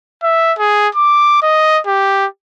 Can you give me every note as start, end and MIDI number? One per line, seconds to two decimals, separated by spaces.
0.23 0.53 76
0.58 0.88 68
0.95 1.41 86
1.42 1.80 75
1.86 2.26 67